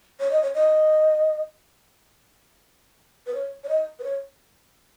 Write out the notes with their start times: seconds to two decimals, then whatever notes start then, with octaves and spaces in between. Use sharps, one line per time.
0.20 C#5
0.31 D#5
0.43 C#5
0.54 D#5
3.27 B4
3.34 C#5
3.64 C#5
3.69 D#5
3.99 B4
4.04 C#5